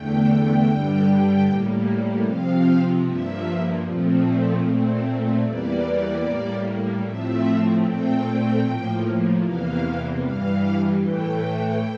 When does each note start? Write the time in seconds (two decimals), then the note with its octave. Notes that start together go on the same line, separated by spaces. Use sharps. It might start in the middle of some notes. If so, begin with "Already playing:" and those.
Already playing: E2 D3 A3 G5
0.64 G2 D3 G3
1.44 A2 G3 A#3
2.23 C3 F3 C4 F5
3.03 G2 F3 A#3 E5
3.83 A#2 F3 A3 C4
4.62 A#2 A3 C4
5.42 E2 E3 G3 A#3 D5
6.22 A2 G3 A#3
7.02 A2 F3 A3 C4 E5
7.82 A#2 A3 C4 G5
8.62 A2 F3 A#3
9.41 E2 C3 E3 A#3 F5
10.21 G2 E3 G3 F5
11.00 A2 E3 A3 G5